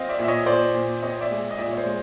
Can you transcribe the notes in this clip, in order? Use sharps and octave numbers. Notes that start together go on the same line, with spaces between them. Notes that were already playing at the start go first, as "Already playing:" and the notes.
Already playing: F3 C4 D#5 F5
D5 E5
A#2 E5
C#5 D#5
A#2 C5 D5
A#2
C4 C#5 D#5
D5 E5
G#3
D#5
A#2 D5 E5
C#5
C5 D5
G#3